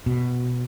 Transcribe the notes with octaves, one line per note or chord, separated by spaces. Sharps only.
B2